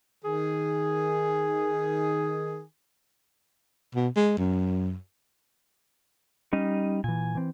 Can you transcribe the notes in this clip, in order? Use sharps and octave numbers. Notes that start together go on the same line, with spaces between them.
D#3 G#4
B2
G#3
F#2
G3 C#4 D#4 D#5
A#2 E3 G#5
E3 C4